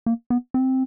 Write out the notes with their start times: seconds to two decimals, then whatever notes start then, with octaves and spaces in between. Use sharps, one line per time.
0.06 A#3
0.30 B3
0.54 C4